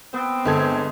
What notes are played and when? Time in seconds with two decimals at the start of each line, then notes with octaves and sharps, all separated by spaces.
0.14 B3 C4
0.45 G1 G#3 A4 G#6